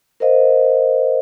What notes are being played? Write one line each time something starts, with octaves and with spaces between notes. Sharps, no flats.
A#4 C5 D#5 F5